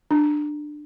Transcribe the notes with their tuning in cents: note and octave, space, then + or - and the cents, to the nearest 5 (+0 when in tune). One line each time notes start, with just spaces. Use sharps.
D4 +20